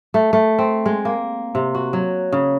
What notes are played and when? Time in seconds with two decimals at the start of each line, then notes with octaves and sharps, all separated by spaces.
0.14 A3
0.33 A3
0.59 C4
0.86 G#3
1.05 A#3
1.55 C3
1.75 F#4
1.93 F#3
2.32 C#3